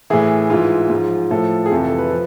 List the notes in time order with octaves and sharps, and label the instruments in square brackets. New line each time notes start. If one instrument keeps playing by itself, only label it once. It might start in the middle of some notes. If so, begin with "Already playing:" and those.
[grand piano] A2 E3 G#4
G#2 E3 F4
G#2 F3
A2 F3 A4
G#4
F2 C3 E3 A4
A4
B4
F3